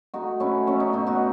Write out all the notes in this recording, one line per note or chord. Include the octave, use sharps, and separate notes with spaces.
A3 D#4 F#4
A3 C#4 E4
A3 C#4
D#4
B2 D#4
D#4 F#4